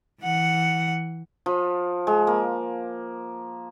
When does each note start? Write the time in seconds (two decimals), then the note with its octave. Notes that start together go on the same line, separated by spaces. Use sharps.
0.21 E3 F#5
1.46 F3
2.07 G#3
2.27 A#3